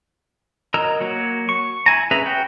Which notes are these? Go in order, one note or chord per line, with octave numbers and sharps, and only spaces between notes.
F#3 A#4 D#5 A#5 E6
F#3 A#3 F#4
C#6
E4 G#5 A#5
C#4 G#4 B4 E5 A#5
F#4 G5